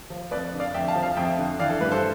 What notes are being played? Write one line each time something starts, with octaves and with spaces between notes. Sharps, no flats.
F3
F2 B4 D5
D3
D5 F5
F2 E5 G5
F5 A5
F3
F5 A5
F2 E5 G5
D3
E3 D5 F5
A4
G2 B4
A4 C5